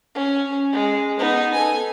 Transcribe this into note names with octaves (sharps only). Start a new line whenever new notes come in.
C#4
G#3
B3 D#4
A4 G#5